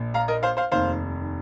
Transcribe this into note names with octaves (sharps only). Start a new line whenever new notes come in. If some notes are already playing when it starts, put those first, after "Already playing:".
Already playing: A#1 A#2
F5 A#5
A#4 D#5
C5 F5
C5 F5
F1 D#2 D#3 C5 F5